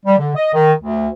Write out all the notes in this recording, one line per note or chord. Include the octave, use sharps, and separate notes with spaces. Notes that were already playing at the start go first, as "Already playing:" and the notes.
G3
D3
D#5
D#3
D2